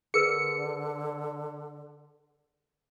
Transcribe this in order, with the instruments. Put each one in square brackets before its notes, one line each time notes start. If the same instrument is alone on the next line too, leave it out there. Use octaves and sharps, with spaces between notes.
[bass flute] D3 [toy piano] G#4 A#4 B4 [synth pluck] C#7